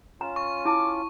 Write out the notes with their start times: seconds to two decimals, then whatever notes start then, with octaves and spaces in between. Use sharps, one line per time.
0.21 C#4 F4 A#5
0.36 C#6
0.65 E4 A5 D6